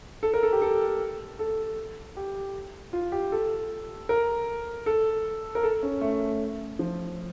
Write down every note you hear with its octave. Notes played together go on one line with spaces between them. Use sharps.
A4
A#4
A4
G4
A4
A4
G4
F4
G4
A4
A#4
A4
A#4
A4
C#4
A3
F3